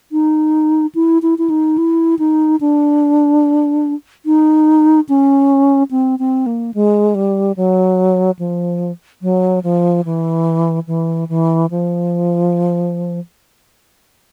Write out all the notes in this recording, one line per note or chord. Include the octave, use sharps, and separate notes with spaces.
D#4
E4
E4
E4
D#4
E4
D#4
D4
D#4
C#4
C4
C4
A#3
G#3
G3
F#3
F3
F#3
F3
E3
E3
E3
F3